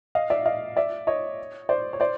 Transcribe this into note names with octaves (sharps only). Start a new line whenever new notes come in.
D#5 F5
D5 E5
D#5 F5
D5 E5
C#5 D#5
C5 D5
C#5
C5 D5